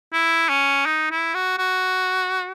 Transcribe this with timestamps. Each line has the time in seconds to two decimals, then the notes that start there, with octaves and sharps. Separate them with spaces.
0.13 E4
0.50 C#4
0.86 D#4
1.11 E4
1.35 F#4
1.58 F#4